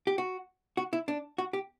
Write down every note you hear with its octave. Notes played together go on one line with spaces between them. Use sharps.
G4
F#4
F#4
E4
D4
F#4
G4